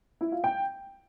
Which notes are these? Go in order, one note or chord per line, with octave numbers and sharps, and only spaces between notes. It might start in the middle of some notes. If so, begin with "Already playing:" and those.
E4
F4
G5